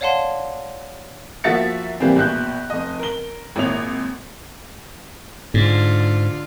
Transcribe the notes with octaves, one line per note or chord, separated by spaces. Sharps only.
C#5 D5 F5 F#5 A5 C6
F3 A#3 F#4 E5 A6 C#7
C3 E3 G3 A#3 C4
A#1 B2 F#6 G6
F1 D#5
A#4 G7
G#1 A#2 E4 C#5 F7
G#2 D3 F4